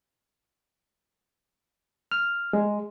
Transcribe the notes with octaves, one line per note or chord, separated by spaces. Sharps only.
F6
G#3